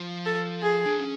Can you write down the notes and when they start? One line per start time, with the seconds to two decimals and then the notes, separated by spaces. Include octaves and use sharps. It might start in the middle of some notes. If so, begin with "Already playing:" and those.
Already playing: F3
0.26 A4
0.63 G#4
0.86 D4
0.99 C#4